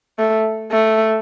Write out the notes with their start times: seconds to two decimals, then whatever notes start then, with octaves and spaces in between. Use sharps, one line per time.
0.19 A3
0.71 A3